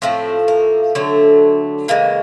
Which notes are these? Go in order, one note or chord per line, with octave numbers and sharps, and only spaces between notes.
A2 F3 A3 C4
A#3
D3 F#3 A3
C#3 E3 G#3 A#3